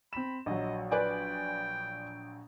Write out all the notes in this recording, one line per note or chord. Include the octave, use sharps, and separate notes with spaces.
C4 B5 E7
A#1 F#3 D#5
B4 D5 G5 G#5